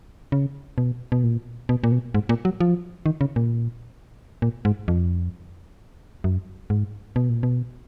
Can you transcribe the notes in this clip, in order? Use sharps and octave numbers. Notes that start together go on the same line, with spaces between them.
C#3
B2
B2
A#2
B2
A#2
B2
G#2
A#2
F#3
F3
D#3
C#3
A#2
A#2
G#2
F2
F#2
G#2
B2
A#2
B2